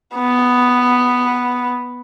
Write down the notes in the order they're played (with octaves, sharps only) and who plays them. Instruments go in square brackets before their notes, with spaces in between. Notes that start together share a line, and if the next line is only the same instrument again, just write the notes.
[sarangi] B3